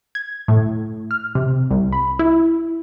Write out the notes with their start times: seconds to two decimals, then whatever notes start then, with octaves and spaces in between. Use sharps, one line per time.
0.15 G#6
0.48 A2
1.11 F6
1.35 C3
1.71 C2
1.93 B5
2.19 E4